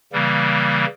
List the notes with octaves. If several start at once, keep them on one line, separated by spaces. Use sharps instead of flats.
C#3 E3 G3 A#3